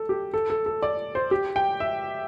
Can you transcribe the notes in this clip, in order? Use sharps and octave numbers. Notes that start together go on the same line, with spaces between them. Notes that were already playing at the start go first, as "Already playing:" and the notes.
Already playing: A4
G4
A4
A4
A4
D5
C5
G4
G5
E5